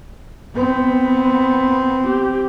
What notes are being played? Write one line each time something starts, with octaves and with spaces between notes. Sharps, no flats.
B3 C4
G4